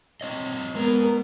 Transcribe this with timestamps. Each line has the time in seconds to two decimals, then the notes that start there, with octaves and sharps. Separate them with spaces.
0.21 C4 C#5 D#5
0.75 G#3 B3 A#4 A#5